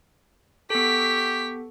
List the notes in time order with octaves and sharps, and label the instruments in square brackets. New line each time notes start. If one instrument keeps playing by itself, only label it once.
[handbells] B3 A4 [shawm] G4 [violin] C#6 B6